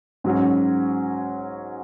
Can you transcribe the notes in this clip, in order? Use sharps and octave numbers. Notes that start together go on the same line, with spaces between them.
G#2 F#3 C#4